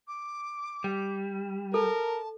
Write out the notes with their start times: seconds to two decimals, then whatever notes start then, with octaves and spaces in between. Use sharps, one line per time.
0.07 D6
0.84 G3
1.74 A4 A#4 A5